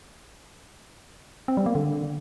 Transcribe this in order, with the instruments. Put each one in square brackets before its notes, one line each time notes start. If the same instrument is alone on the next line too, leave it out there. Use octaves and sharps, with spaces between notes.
[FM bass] C4
G3
A#3
D3